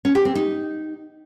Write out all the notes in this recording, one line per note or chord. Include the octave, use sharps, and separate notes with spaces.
C#4
G4
C4
D#4